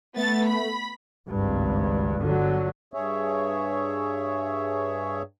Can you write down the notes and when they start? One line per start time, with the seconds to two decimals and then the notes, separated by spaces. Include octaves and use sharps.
0.17 A3 B3 A6
0.47 B5
1.28 G#1 C#2 G2
2.18 G1 D3 F#3
2.94 G2 G#4 C#5 E5